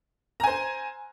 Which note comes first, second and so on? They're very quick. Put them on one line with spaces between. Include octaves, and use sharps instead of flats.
A#5 G#5 C5